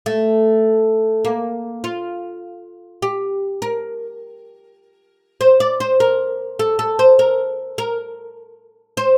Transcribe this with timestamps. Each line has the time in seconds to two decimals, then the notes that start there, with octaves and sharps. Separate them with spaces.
0.06 A3
1.25 A#3
1.84 F4
3.02 G4
3.62 A#4
5.41 C5
5.60 D5
5.80 C5
6.00 A#4
6.59 A4
6.79 A4
6.99 C5
7.19 A#4
7.78 A#4
8.97 C5